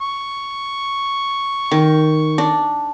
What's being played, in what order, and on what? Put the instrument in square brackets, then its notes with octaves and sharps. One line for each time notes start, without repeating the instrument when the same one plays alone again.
[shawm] C#6
[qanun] D#3
D4